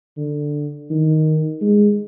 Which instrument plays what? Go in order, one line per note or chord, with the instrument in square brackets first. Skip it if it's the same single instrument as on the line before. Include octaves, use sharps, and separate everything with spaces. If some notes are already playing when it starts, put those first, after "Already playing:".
[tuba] D3
D#3
G#3